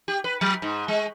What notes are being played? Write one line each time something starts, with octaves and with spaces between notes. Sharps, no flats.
G4
B4
F#3
G#2
G#3